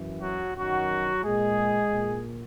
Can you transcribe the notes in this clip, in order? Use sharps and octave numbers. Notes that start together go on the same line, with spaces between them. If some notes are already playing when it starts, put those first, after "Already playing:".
Already playing: F#2 E3
F#3 F#4
F#2 D#3 F#3 F#4
A#2 G#3 G#4
A#2